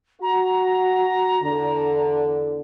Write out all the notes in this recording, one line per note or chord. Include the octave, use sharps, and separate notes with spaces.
F#4 A#5
E2 D3